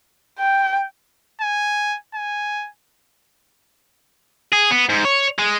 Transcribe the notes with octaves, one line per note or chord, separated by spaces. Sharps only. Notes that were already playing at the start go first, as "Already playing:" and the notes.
G5
G#5
G#5
G#4
B3
G#2
C#5
G#3